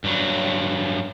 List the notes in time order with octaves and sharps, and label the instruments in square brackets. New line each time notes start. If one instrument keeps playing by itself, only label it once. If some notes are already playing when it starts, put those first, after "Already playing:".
[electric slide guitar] G2 F#3